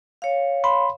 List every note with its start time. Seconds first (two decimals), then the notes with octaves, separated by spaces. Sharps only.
0.22 C#5 F5
0.64 B5 C6